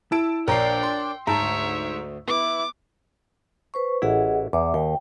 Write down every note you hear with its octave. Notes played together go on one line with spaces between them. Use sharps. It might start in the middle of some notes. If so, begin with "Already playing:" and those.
E4 A5 E6 D7
A#1 D4 A#4 C#5 D5 G5 A#5 C7
C6
D2 G#2 C#5 E5 A5 A#5
B3 E4 D6
B4 C5 C#6
A1 E4 G#4 D#5 F#5
E2 E5 D6
D#2 G5